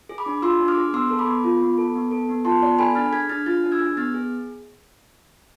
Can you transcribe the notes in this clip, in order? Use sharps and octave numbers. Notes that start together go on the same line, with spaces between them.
G#4
B5 D6
D4
F4 C6 E6
D4
D6 F6
G#4
B3 C6 E6
A4
B5 D6
B3
F4
B3
A4
B3
A4
B3
F4 A5 C6
B3 D5
A4 G#5 B5
D4 F6 A6
G#4 G#6 B6
D4 F6 A6
F4 F6 A6
D4
E6 G#6
G#4
B3 F6 A6
G#4